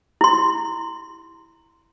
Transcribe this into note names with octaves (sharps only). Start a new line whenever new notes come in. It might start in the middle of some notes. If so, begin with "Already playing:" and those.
E4 C6